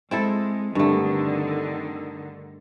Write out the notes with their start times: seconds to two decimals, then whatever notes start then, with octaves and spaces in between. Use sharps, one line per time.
0.11 G#3 C4 E4 A4
0.75 G2 D3 D#3 A3